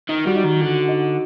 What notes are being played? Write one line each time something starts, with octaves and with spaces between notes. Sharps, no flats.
D#3 D#4
G3 F#4
D#4
D#3
D3 F#4
D#4